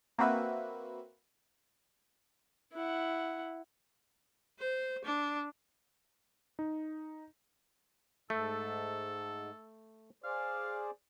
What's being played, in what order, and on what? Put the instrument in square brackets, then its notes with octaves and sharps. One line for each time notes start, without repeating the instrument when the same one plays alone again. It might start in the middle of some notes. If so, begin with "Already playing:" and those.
[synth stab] A#3 C4 F#4 B4 E5
[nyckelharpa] E4 F#5
[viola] C5
D4
[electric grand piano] D#4
[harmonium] G#2 [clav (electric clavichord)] A3 [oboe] A4
[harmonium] G#4 C5 D5 [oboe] F5